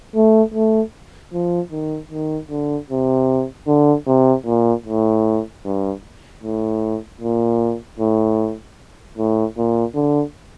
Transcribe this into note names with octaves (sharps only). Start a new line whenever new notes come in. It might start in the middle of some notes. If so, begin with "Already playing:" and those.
A3
A3
F3
D#3
D#3
D3
C3
D3
C3
A#2
A2
G2
A2
A#2
A2
A2
A#2
D3